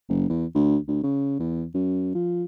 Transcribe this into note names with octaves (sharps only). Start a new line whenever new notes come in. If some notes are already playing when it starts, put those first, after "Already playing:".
F#1
E2
D2
D2
C#3
E2
F#2
F3